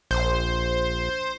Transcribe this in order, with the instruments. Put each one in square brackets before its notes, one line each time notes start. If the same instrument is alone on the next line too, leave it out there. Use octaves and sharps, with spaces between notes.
[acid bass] A#1 [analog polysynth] C5